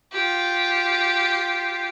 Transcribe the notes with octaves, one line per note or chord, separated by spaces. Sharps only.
F4 G4